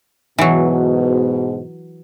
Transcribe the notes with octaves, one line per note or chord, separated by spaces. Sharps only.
G#2 B2 E3 F#3